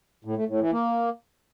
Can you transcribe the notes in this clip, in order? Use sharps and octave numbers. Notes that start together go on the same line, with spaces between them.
A2
A3
A2
E3
A#3